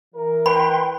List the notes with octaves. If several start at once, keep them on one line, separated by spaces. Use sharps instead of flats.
E3 A#4
B4 G5 B5 C6